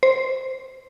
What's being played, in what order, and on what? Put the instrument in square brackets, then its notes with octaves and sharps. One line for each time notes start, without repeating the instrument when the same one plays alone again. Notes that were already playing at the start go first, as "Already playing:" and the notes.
[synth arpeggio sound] C5